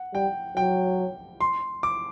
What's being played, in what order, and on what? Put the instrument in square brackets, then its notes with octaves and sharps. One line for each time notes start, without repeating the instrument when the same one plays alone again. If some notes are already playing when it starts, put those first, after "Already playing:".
Already playing: [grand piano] F#5
[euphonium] G3 [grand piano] G5
[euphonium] F#3 [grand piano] G5
[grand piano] C6
D6